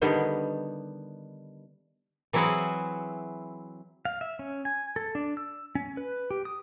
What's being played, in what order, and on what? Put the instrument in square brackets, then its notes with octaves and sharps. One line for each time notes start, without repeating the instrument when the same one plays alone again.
[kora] D3 D#3 G3 B3
[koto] E3 F#3 C4 E4 G#4 F#5
[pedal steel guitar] F5
E5
C#4
G#5
A4
D4
E6
C#4
B4
G4
D#6